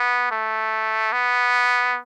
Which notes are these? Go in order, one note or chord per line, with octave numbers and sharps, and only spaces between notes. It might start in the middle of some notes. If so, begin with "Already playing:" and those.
Already playing: B3
A3
B3